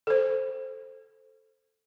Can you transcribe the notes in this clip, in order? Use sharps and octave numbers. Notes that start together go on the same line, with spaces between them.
A4 C5